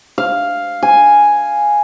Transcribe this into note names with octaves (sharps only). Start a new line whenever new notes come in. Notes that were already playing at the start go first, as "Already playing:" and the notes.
F5
G#5